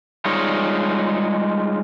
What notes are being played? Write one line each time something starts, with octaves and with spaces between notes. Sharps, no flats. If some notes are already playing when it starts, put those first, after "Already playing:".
G3 G#3 D#4 F4 C#5 D#5